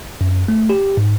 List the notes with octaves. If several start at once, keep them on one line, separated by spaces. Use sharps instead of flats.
F#2
A3
G4
G#2